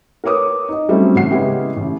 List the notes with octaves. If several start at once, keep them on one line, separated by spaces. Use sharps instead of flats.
A#4 B4 C#5 D6 D#6
D#4 D#5
F#3 G3 A3 C4 C#4 E4
A1 F#5 C7
C#3 G#3 B3 C#4 E4 G4
A1